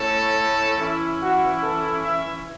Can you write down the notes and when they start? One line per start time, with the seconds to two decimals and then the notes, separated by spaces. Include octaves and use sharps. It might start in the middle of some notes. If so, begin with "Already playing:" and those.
Already playing: A2 A3 C#4 E4 A4
0.78 E3 C#4 E4
1.20 F#4
1.63 A4
2.06 E5